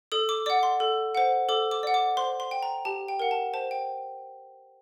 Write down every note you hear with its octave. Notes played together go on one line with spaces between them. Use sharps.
A4 D#6
D6
D5 F#5 D6
C6
A4
C5 F#5
A4 D6
D6
D5 F#5
D6
C5 C6
C6
G5
A#5
G4 A5
G5
A#4 F#5
A5
C5 A5
G5